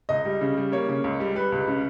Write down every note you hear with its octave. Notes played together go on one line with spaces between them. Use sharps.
C#2 D#5
G3
C#3
G3
A#3 C#5
C#3
C#2
G3
G3 B4
C#2
C#3